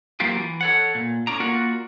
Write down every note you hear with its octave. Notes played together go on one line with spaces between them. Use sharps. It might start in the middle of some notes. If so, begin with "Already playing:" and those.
F#3 A#3 C4 F4 G4
E3
A4 C#5 F#5
A#2
A2 C#4 D5 A#5
A#3 F4 F#4 A#4 D5 F#5